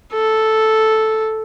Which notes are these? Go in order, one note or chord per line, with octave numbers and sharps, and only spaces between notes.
A4